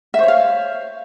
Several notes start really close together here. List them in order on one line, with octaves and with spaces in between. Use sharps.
E5 C5 C#5 F5